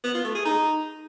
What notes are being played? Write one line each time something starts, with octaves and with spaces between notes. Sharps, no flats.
B3
F4
A3
G#4
D#4